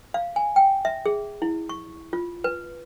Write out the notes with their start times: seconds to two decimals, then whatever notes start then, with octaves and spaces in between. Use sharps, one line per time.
0.14 F5
0.36 G#5
0.56 G5
0.85 E5
1.06 G#4
1.42 E4
1.69 C#6
2.13 F4
2.44 B4